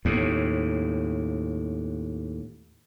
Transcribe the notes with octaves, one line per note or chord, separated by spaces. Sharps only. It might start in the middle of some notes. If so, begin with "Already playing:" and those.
D#2 A2